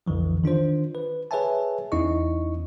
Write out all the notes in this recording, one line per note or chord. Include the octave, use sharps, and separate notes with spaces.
B1 F2 D3 E3 F3
D#3 D4 F4 C5
B4
G#4 B4 C#5 E5 G#5 A5
E2 C#4 D#4 E4 D#5 C#6